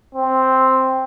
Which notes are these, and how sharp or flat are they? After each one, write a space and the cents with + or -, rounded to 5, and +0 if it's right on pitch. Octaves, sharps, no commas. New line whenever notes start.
C4 +0